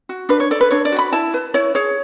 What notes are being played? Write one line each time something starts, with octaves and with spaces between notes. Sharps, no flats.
F#4
D4 B4
C#5
A4 D5
B4
D4 C#5
D5
F#4
B5
E4 A5
B4
E4 C#5
G#4 C#5